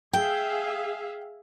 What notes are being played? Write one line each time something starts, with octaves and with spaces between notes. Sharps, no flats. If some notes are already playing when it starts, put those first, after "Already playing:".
G#4 E5 F5 G5